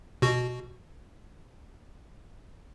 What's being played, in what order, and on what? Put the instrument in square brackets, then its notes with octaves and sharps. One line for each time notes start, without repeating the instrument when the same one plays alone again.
[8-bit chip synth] B2 F#4